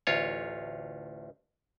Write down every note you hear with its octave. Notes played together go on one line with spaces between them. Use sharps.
A1 D2 F4 C#5